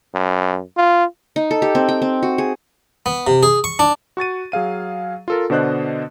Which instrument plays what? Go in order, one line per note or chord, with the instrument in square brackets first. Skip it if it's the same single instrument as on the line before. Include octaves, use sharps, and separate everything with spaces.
[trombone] F#2
F4
[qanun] D#4
A4
G4
C4
G5
C4
F#4
G#4
[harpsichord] B3
C3
G#4
C#6
D4
[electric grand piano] F#4 C#6 A6 D#7
F#3 G#4 F5 D#7
F4 A4 A#4
B2 D3 D4 C5 D#5 F#6